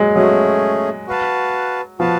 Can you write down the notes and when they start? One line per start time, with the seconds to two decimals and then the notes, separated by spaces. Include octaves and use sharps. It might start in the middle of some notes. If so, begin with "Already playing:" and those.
Already playing: F#3 G#3
0.15 F#3 A3 C#4 G#4
1.07 F#4 B4 F5 A5
1.99 F3 F#4 B4 F5 A5